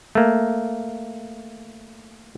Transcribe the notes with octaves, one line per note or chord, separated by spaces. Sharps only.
A3 A#3